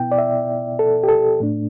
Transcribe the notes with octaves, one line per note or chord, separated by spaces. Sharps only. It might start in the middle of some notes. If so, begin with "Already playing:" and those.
Already playing: B2 B3 E4 G5
D5
E5
A4
G4
A4
A2 A3 D4